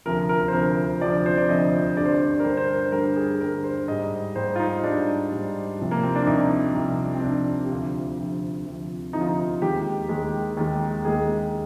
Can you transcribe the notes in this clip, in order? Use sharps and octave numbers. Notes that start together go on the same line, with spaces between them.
D2 C3 F3 A#4
A#4
C5
D2 C3 F3 A#4
D2 C3 F3 D5
C5
D5
D2 C3 F3 D#5
G2 D3 G3 D5
C5
D5
A#4
G2 D3 G3 C5
C5
A#4
G2 D3 G3 A#4
G#4
G2 D3 G3 A#4
C5
G#2 G3 D#5
G#2 G3 C5
F4
D#4
G#2 G3 D4
G#2 G3
C2 C3 F3
A#3
C4
D4
C2 C3 F3 D#4
C2 C3 F3
C4
C2 C3 F3 D4
G4
D2 C3 F3 F4
D2 C3 F3
D2 C3 F3
D2 C3 F3 D#4
F4
D#4
D#2 D#3 G#3 G4
D#2 D#3 G#3
D#2 D#3 G#3
D#2 D#3 G#3 G#4